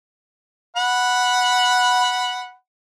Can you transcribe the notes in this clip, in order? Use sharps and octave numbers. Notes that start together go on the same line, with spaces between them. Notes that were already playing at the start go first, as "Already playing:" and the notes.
F#5 B5